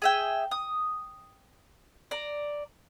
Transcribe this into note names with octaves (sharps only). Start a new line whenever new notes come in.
G#4 E5 G5
D#6
D5 A#5